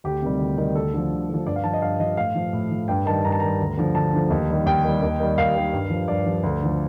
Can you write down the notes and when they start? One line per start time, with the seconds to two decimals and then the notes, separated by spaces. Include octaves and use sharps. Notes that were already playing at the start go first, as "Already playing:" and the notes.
0.04 D2 G4
0.22 C3 D#3 G3
0.39 D2
0.57 C3 D#3 G3
0.75 D2 A4
0.93 D3 F3
1.11 D2
1.29 D3 F3
1.46 G2 D5
1.56 F5
1.64 F3 A5
1.73 D#5
1.82 G2 F5
2.00 F3 D#5
2.17 A2 F5
2.35 F3
2.53 A2
2.71 F3
2.88 G2 G5
3.06 D#3 G3 A5
3.25 G2 A#5
3.32 A5
3.40 D#3 G3 A#5
3.60 D2
3.77 D3 F3
3.95 D2 A5
4.13 D3 F3
4.30 D#2
4.48 D#3 G3
4.66 D#2 G5
4.84 D#3 G3
5.02 D#2
5.20 D#3 G3
5.38 D#2 F5
5.55 D#3 G3
5.73 G2
5.90 F3
6.08 G2 D5
6.26 F3
6.43 D2
6.61 D3 F3